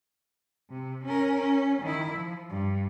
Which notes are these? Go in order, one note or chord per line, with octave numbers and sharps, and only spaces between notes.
C3
C#4 A#4
C#4
D#3 E4
F3
G2